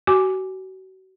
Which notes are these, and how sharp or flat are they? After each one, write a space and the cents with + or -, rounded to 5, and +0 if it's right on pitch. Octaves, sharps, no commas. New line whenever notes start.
F#4 +35 G#5 +0 D6 +0